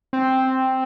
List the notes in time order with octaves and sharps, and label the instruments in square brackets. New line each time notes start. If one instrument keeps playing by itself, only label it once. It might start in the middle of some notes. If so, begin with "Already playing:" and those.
[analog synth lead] C4